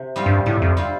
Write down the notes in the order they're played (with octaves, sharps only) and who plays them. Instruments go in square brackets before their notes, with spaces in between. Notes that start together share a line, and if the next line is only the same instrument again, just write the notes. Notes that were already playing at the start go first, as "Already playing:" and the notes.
Already playing: [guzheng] C3
G3 C4 F4
[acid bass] G2
[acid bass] A2 [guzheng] C3
[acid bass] F2
[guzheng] G3 C4 F4